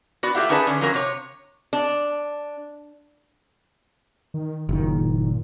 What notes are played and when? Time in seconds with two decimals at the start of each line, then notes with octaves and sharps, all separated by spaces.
0.23 B3 F#4 D5
0.35 A3 F4 G4 E5 F#5
0.49 C#4 D#4 G#4 B4 D5 A5
0.67 D3 C#4
0.81 F2 F#3 C#4 A#4
0.94 C3 C#5
1.73 D4
4.34 D#3
4.69 F#1 A#2 D#3